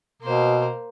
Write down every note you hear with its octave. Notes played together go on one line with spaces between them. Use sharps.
B2 A#3 C5